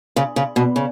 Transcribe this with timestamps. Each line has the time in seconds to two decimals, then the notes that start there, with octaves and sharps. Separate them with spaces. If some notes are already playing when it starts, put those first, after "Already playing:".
0.16 C#3
0.36 C#3
0.56 B2
0.76 C#3